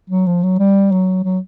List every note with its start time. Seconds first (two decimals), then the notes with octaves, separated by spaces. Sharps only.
0.10 F#3
0.27 F3
0.43 F#3
0.59 G3
0.92 F#3
1.24 F#3